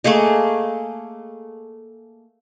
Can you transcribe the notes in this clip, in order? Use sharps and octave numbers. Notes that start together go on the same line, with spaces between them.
A3 A#3 G#4 D#5